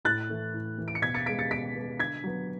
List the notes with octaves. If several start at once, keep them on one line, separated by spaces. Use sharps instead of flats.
A2 F#6 A6
E3 A3
A2
E3 A3
D7
C#7
B2 G#6 B6
A6 C#7
G#3 B3 B6 D7
A6 C#7
B2 B6 D7
G#3 B3
D3 G#6 B6
F#3 B3